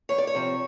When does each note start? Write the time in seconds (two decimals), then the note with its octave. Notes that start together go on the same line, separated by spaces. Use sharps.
0.09 E2 C#5
0.18 D5
0.27 C#5
0.35 C3 F3